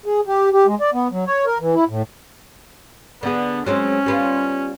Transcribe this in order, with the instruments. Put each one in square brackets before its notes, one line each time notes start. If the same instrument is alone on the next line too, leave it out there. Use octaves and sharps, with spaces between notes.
[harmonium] G#4
G4
G4
G#3
D5
B3
F#3
C#5
A#4
E3
E4
A2
[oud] D3 G#4 [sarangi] B3
[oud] F#3 G#3 C4 [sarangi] C#4
[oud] G3 B3 F4